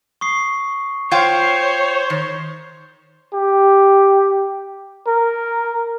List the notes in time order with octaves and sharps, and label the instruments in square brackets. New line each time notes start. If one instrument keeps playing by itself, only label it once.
[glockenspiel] C#6 D#6 C7
[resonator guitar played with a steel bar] F4 F5 G5 [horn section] C5 [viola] C#5 [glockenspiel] G#6
[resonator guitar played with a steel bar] D#3
[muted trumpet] G4
A#4